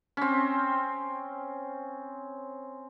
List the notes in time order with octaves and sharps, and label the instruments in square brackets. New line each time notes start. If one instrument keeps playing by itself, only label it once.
[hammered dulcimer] C4 C#4